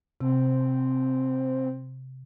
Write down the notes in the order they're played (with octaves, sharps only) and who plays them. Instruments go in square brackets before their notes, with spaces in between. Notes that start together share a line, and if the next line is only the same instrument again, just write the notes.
[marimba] C3 [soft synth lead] C4